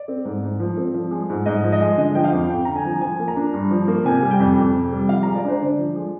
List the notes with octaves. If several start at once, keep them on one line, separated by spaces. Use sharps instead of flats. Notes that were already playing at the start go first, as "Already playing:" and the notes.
Already playing: D5
C4
G#2
G#2
F3
C4
F3
G#3
G#2
G#2 D#5
F3
D#5
G#3
D3 D#5
F3 G5
F5
F2
F2 G5
D3 A#5
G#5
F3
F3 G#5
A#3
A#5
D4
G2
F3
A#3
C3 G#5
G3
G5
F2
F2
C3
G3
F3 F5
G#3 A#5
D5
D4 C5
D3 D5
F3
G#3